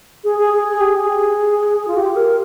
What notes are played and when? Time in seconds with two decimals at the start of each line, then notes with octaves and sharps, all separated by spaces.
0.24 G#4
0.39 G#4
0.53 G#4
0.67 G#4
0.81 G4
0.95 G#4
1.88 F4
1.97 G4
2.16 A#4